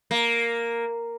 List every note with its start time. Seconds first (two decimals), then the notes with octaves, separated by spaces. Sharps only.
0.11 A#3